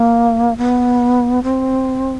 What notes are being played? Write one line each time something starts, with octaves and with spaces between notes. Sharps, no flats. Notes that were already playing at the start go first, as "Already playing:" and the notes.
Already playing: A#3
B3
C4